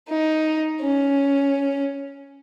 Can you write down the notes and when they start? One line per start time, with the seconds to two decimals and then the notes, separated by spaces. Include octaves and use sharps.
0.09 D#4
0.81 C#4